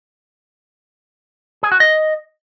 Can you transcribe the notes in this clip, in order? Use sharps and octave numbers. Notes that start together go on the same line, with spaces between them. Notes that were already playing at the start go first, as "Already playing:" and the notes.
G#4
F#4
D#5